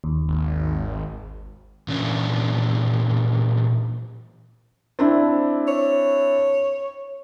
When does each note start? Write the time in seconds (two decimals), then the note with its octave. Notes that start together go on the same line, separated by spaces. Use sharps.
0.04 D#2
0.28 G#1
1.88 A#2 E3 C#4 D4
4.99 C4 D4 E4
5.68 C#5